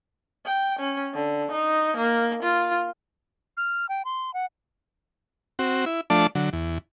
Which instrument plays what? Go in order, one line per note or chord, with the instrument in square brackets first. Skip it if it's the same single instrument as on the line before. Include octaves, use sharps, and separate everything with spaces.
[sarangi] G5
C#4
D3
D#4
A#3
F4
[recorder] F6
G5
C6
F#5
[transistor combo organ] C4 F#4
E4
F3 A3 D4 D5 A5
D3 F#3
E2